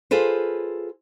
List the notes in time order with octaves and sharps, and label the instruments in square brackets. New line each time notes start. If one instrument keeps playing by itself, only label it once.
[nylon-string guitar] F4 G#4 A4 B4 C5